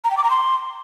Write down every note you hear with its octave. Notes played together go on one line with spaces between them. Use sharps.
A#5
G5
D6
A#5
C6